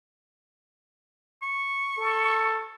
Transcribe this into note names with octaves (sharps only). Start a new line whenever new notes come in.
C#6
A4